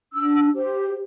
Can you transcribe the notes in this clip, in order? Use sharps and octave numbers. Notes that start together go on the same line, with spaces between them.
D4 E6
G4 C5